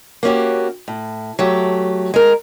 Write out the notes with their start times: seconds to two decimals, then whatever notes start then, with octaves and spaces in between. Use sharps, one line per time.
0.23 A#3 B3 C#4 F#4 G4
0.88 A2
1.39 F#3 A3 G4
2.14 G#3 A#4